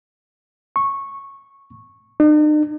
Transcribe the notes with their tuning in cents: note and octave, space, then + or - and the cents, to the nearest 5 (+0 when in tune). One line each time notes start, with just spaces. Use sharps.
C#6 -10
D#4 -45